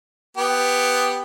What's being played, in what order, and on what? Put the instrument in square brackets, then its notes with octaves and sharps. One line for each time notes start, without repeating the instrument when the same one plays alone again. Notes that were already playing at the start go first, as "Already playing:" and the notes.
[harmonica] B3 G4